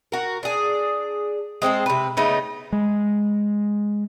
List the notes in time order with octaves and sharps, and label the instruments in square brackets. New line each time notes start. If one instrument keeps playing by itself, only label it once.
[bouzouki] F#4 A#4
D4 G#4
G#3 C4 E4 A4
C3 B4
C#3 A3 B3 D#4
[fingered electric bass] G#3